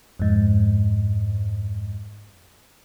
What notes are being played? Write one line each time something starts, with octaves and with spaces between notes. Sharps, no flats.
F2 G#2